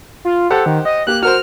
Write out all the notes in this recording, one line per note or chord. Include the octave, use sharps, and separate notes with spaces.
F4
G4 A4 C5 F#5
D#3
D#5
A#3 G4 F#6
F#4 A#4 C5 F6